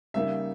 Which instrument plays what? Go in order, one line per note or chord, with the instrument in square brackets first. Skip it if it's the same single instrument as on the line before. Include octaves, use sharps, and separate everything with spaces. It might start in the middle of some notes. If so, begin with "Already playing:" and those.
[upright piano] C#3 G3 A#3 D#4 E5